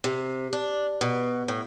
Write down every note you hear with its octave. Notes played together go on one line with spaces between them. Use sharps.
C3
D4
B2
A2